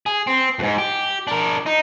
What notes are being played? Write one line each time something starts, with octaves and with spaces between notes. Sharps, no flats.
G#4
C4
F2 G#2
G4
D4 A#4
D#4